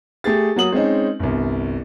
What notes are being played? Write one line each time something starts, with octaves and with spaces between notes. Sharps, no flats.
A3 G4 G#4 A6
F#3 A#3 F#4 D#6 F#7
G#3 C4 C#4 D#4
G1 C2